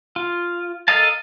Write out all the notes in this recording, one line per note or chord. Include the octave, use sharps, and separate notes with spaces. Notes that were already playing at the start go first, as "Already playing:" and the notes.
F4
A4 A#4 D#5 F5 A5